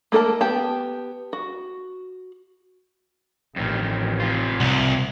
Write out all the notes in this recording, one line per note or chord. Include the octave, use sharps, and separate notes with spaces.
A3 A#3 A4 A#4 A5
B3 G4 A5
F#4
A1 F2 D#3
C3 F4
C2